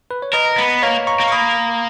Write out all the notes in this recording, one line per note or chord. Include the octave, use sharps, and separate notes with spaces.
B4
C#5
A#4 B4 D#5
B3
A#3 C#5 F5
A#5 C#6
A#3
C#6
B5 D#6